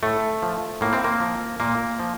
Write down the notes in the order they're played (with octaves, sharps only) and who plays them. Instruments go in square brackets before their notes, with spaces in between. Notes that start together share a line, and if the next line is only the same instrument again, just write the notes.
[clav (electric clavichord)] A2 A3
F3
A2 A#3
C4
A#3
F3
A#2 A#3
F3